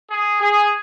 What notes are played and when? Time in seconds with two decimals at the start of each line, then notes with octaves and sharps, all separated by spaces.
0.08 G#4
0.40 G#4